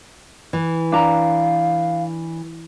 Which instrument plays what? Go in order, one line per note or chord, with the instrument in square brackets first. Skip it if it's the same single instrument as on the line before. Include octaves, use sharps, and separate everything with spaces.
[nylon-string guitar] E3
[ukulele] D4 A#5 [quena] F5